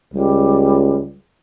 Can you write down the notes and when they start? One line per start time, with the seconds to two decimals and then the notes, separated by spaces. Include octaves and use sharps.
0.14 C#2 G3